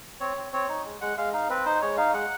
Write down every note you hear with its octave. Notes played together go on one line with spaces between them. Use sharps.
C4 C#5
C4
C4 C#5
D#4
G#3
G#3 F#5
G#3 F5
D#4 F5
C4 B4
D#4 C5
G#3 C#5
D#4 F5
G#3 F#5